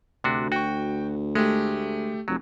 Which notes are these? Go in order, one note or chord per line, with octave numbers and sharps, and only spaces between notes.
D2 C3 D4 F#4
F#4 G5 C#6
G#3 A3 G4
F1 F#3